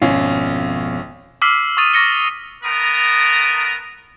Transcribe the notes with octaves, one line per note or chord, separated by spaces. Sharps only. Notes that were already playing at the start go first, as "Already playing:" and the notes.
G#1 F2 B2 C#4 F4
D6 E6 F6 B6 C7
C#6 D#6 A6 D#7
C#6 D6 A6 A#6 C#7 G7
A3 B3 A#4 A#5 D#6